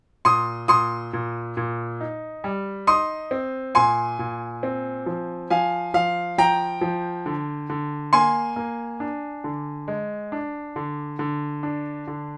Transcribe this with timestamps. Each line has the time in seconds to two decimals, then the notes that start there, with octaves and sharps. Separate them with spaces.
0.25 A#2 C6 D#6
0.68 A#2 C6 D#6
1.13 A#2
1.57 A#2
2.01 D#4
2.44 G3
2.87 D#4 C6 D#6
3.31 C4
3.75 A#2 G#5 C6
4.19 A#2
4.63 C4
5.06 F3
5.50 F3 F5 G#5
5.94 F3 F5
6.38 F3 G5 A#5
6.81 F3
7.26 D3
7.70 D3
8.13 A#3 G#5 C6
8.56 A#3
9.00 D4
9.44 D3
9.88 G#3
10.32 D4
10.76 D3
11.19 D3
11.63 D4
12.08 D3